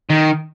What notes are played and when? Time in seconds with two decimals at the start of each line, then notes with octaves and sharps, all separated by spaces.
0.10 D#3